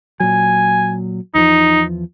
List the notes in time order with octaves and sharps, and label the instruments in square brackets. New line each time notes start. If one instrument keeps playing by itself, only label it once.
[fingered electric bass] A#2 F#3 [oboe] G#5
[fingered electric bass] E2 F3 [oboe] D#4